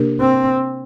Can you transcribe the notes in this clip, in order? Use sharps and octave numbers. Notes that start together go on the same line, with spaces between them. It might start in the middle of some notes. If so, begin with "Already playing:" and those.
Already playing: C3 A#3 D4 G4 A#4
C4